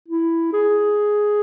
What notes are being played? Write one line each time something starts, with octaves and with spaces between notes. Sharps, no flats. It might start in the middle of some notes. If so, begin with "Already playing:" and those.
E4
G#4